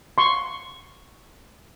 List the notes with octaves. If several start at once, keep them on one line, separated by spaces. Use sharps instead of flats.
C6 C#6